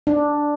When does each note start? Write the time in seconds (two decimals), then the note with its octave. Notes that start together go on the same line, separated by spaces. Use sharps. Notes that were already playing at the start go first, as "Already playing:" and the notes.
0.07 D4